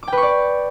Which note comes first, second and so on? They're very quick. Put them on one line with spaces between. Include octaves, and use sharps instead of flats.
D6 G5 B4 C#6 D5